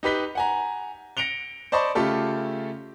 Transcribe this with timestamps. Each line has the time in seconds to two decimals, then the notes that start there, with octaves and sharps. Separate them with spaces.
0.03 D#4 G4 B4 B6 G7
0.35 F#5 G#5 A#5
1.17 A#6 C#7 D7 F7 G7
1.72 C5 D5 D#5 A5 B5 C#6
1.95 C#3 A3 F4 G4 A4